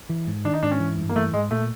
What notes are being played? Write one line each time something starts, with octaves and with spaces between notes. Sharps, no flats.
E3
G#2
D#3 D4
D#4
G#2 D4
C#4
E3
G2
A#3
E3 A3
G#2 G#3
A#2 A3